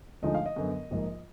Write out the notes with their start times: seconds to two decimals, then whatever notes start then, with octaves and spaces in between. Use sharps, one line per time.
0.22 D2 D3 F3 G#3 D#4 D#5
0.35 F5
0.46 D#5
0.56 F#2 D3 F#3 B3
0.91 A#1 G#2 F3 A#3